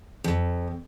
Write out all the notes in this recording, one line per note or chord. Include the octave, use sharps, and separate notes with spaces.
F2